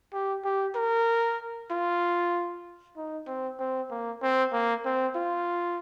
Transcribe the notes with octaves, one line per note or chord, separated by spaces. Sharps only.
G4
G4
A#4
F4
D#4
C4
C4
A#3
C4
A#3
C4
F4